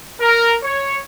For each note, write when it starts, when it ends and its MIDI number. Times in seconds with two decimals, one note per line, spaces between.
0.21 0.55 70
0.64 0.97 73